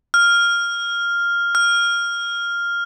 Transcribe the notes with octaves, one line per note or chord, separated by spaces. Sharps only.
F6
F6